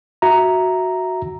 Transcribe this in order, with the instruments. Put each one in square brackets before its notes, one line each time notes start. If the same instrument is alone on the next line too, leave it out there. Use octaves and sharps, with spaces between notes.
[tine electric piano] F#4 E5 A#5